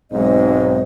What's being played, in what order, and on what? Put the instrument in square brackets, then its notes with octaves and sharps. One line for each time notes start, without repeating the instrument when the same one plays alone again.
[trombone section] B1 G#2 [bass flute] C4 [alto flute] D#5